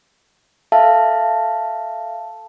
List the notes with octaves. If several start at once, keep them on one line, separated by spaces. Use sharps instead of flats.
A4 E5 F5 A5